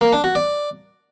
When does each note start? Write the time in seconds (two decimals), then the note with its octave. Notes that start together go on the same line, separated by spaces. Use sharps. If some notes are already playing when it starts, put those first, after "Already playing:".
0.01 A#3
0.13 D4
0.24 F#4
0.35 D5